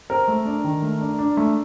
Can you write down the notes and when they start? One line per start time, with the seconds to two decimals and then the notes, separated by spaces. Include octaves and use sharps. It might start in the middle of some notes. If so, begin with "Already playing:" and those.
0.10 C4 A#4
0.28 A3
0.46 D4
0.64 D#3
0.82 A3
1.01 D4
1.18 D4
1.37 A3